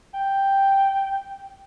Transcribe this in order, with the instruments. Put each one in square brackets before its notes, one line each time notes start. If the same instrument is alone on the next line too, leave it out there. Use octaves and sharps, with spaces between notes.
[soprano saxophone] G5